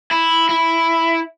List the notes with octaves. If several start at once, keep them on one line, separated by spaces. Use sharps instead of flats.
E4
E4